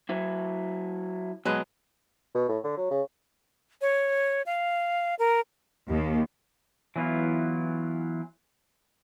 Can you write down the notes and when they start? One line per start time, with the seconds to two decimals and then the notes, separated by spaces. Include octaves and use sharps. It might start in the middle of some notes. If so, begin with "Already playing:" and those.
0.09 F#3 E4
1.45 B2 F#3 G#3 B4 D#5
2.35 B2
2.48 A2
2.64 D3
2.77 F#3
2.91 C#3
3.81 C#5
4.46 F5
5.19 A#4
5.88 D#2
6.96 E3 F#3 B3 E4 F4